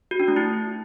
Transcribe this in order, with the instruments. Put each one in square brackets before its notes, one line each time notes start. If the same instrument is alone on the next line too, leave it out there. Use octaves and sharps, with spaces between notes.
[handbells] F#4
D4
A3
E4